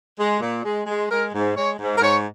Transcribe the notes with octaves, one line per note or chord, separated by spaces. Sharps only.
G#3
A#2
G#3
G#3
G#3 A#4
G#2
G#3 C#5
G#2
A#4
G#2 C#5